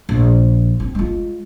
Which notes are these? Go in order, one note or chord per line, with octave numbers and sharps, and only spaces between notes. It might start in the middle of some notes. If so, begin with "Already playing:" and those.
A#1
C4
G#3 F4